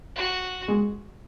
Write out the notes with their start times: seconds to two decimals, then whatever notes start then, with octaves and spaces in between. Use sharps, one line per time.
0.16 F#4
0.68 G#3